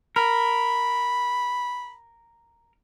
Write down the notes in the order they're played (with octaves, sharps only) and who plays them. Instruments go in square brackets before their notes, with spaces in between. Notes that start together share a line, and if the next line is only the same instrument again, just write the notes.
[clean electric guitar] A#4 [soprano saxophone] B5